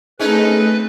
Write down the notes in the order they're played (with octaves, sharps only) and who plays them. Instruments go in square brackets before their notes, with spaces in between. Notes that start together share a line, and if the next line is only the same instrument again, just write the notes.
[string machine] A3 C4 [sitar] C#4 D#4 A4 [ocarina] G#4 [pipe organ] B4